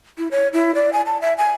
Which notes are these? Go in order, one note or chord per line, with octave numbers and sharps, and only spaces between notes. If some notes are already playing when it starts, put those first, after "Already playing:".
E4
C#5
E4
D5
G#5
A5
E5
G#5